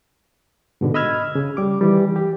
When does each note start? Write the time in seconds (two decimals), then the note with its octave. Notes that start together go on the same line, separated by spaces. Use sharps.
0.81 G#2 B2 D3
0.94 D#5 B5 E6 F6 G#6
1.35 C#3
1.57 G3 D6
1.81 D#3 E3 G3
2.16 G4